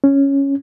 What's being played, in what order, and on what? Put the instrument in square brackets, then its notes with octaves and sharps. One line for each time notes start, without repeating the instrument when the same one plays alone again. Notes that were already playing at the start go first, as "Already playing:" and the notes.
[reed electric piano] C#4